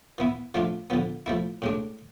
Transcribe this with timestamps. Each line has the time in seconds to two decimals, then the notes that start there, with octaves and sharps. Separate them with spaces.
0.18 E3 B3 E4
0.54 F3 A3 D4 F4
0.90 D3 F3 B3
1.26 F3 A3 E4
1.62 A2 G#3 D4